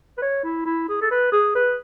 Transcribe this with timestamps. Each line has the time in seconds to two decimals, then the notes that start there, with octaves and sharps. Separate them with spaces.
0.18 B4
0.22 C#5
0.44 E4
0.66 E4
0.89 G#4
1.01 A4
1.11 B4
1.32 G#4
1.55 B4